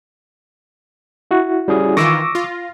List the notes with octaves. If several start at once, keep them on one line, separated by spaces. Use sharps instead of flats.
E4 F#4
G3 C#4 G#4
D#3 E3 F4 C#6 D6 E6 A#6
F4